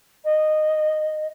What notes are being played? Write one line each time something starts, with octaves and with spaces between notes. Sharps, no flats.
D#5